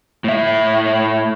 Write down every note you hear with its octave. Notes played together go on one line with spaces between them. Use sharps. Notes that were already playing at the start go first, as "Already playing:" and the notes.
A2 E5